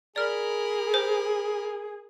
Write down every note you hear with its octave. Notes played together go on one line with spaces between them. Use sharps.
G#4 A#4 D5 B5 F6
C5